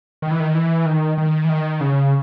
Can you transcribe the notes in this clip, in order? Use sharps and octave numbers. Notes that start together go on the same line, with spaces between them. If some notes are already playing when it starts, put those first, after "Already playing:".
D#3
E3
D#3
E3
D#3
D#3
E3
D#3
C#3